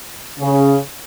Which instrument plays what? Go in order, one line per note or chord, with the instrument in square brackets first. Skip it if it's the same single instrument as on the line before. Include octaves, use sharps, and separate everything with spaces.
[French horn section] C#3